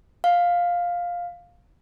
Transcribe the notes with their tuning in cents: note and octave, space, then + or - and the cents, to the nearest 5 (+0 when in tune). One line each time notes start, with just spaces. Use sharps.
F5 +10